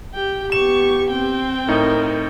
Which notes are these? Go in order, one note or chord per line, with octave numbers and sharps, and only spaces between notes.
G4 G5
B3 G4 C#6 E7
C4 G5
A2 D#4 A#4